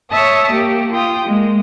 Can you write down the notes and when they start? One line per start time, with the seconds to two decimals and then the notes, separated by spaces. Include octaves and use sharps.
0.10 C#5 E5 A5 D#6
0.51 A#3 G4
0.92 F4 G5 D#6
1.25 G#3 A#3